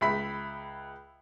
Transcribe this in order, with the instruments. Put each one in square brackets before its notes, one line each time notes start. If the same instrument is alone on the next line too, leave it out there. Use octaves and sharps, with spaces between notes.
[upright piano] C#2 E5 B5 B6